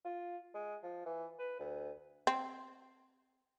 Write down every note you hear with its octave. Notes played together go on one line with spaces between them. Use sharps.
F4
G#3
F3
E3
B4
D2
C4